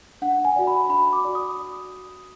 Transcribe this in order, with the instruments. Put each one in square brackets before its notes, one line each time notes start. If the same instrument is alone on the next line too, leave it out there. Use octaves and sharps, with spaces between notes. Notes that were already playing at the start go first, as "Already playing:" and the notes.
[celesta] D4 F#5
G#5
F#4 D5
B5
D4 B5
D6
F#4 D5
D#6